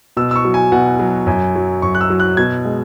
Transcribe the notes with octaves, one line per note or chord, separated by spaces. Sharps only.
B2 E6
E6
C#6
F#3
G#5
B2 F#5
F#3
F#2 G#5
F#3
F#2 C#6
F#6
E6
F#3
F#6
B2 G#6
G#3